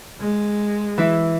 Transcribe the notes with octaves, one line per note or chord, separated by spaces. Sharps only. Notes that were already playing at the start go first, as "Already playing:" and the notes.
G#3
E3 E4